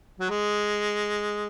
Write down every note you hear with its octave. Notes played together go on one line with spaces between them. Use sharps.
F#3
G#3